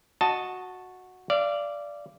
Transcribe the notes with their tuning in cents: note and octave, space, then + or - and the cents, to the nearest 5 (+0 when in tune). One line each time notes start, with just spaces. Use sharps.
F#4 -10 D#5 +0 A5 +0
D5 -5 F5 -30